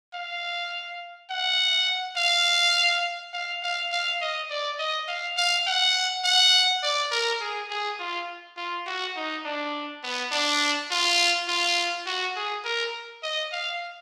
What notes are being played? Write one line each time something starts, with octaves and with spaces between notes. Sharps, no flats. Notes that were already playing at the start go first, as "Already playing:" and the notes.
F5
F#5
F5
F5
F5
F5
D#5
D5
D#5
F5
F5
F#5
F#5
D5
A#4
G#4
G#4
F4
F4
F#4
D#4
D4
B3
D4
F4
F4
F#4
G#4
A#4
D#5
F5